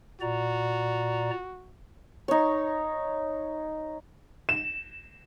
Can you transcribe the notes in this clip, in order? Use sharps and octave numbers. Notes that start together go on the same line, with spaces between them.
A#2 F#4 D5 A#5
D#4 C#5
E7